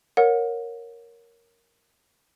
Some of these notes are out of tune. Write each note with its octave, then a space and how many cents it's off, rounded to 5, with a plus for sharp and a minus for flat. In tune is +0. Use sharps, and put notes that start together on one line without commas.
A#4 +0 C#5 +0 F#5 -35